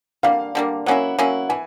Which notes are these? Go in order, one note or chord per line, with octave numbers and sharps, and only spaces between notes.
D3 G3 A#3 F5
D3 G3 A#3
F#3 A#3 C#4 E4 F#5
F#3 A#3 C#4 E4
E3 G#5